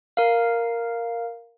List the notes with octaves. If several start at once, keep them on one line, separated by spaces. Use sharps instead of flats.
A#4 F5